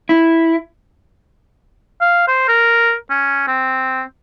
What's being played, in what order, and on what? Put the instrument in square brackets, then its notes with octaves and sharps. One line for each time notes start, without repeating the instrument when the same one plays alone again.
[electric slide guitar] E4
[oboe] F5
C5
A#4
C#4
C4